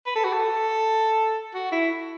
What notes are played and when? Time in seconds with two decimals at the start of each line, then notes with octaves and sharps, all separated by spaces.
0.06 B4
0.15 A4
0.24 F#4
0.33 A4
1.54 F#4
1.72 E4